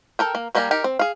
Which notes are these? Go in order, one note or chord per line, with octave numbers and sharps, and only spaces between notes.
A4 A#4 G5
A#3
G3 A#3 G4 A#4 G#5
D#4 G4 A#4
C4
G#4 F5